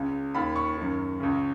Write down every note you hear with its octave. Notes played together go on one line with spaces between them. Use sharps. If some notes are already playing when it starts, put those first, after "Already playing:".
Already playing: C#2 C#3
D#2 D#3 B5
C#6
F#2 D#3
C#2 C#3